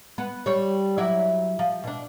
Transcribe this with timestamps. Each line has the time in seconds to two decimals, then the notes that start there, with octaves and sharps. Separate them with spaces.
0.18 B3
0.46 G3 C#5
0.98 F#3 E4 D5
1.59 F3
1.84 B2 D4